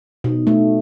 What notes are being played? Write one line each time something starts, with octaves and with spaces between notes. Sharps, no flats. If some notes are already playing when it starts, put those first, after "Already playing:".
B2 D#4
A3